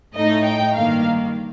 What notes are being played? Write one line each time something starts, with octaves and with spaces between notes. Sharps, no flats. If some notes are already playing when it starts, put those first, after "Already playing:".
A2 A3 D#4 D#5
G5
G2 D#3 A#3 F5